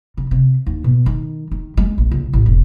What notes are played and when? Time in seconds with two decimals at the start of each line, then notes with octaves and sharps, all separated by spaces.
0.17 C#3
0.31 C3
0.66 D#2
0.84 B2
1.06 D#3
1.51 D#3
1.77 G#3
1.98 A#1
2.11 C#2
2.33 A1
2.46 E1